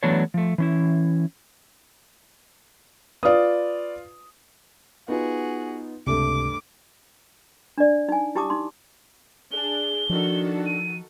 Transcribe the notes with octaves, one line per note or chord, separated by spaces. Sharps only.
E3 F#3 A3 B3 D4 C#5
F3 A3
E3 C#4 E4
F4 B4 D5 D#6
B3 D#4 F4 F#4 G#4
C#2 G2 C3 A3 D6
D4 D5
D#4 G#5
E4 G4 A5 D6 D#6
D#4 C6
D4 G#4 G7
D#3 F3 D4 F#4 A4
D#7